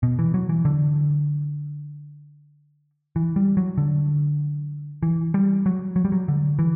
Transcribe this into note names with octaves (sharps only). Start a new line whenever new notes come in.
B2
E3
F#3
E3
D3
E3
G3
F#3
D3
E3
G3
F#3
F#3
G3
F#3
D3
E3